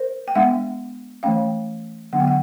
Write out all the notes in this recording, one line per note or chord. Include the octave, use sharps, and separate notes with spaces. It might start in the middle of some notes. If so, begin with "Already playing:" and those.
Already playing: A#4 C5
G5
G#3 B3 D4 E5 F#5
E3 A3 C#4 F5 G5
D3 F#3 B3 D4 F#5
G5
F#5